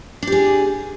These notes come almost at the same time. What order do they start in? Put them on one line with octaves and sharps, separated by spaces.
D4 G4 G#4